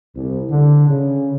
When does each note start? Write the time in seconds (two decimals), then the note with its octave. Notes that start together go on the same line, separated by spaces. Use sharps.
0.15 C2
0.50 D3
0.89 C#3